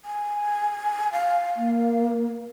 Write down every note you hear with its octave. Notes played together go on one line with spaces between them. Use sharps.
G#5
F5
A#3